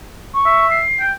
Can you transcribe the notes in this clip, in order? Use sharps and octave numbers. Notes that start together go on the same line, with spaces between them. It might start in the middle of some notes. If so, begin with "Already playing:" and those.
C#6
E5
C7
G5